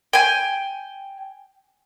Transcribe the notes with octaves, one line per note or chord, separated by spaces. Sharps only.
G5 G#5